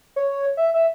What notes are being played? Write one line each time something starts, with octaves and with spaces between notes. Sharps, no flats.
C#5
E5
E5